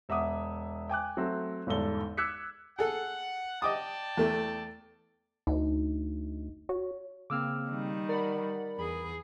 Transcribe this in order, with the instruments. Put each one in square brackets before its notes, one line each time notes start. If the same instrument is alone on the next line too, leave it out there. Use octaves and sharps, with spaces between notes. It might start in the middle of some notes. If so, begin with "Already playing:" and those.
[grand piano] E1 E5 F#5 D6 D#6
G5 G#5 D6 F#6
F#3 A3 C4
G1 E2 G#2 A4 G7
D6 E6 F#6 G#6 B6 C#7
[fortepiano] G#4 A4 [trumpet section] F#5
[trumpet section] D5 G5 A5 [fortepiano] D#5 D6 D#6
[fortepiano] E2 A3
[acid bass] D2 [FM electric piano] D#4
[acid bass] F#4 [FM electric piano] C#5
[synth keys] C#3 A#3 C4 [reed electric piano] D6 E6 F6
[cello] D#3 G3
[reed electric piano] A#4 [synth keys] D5 F#5 B5
[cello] E2 G#4 [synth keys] B5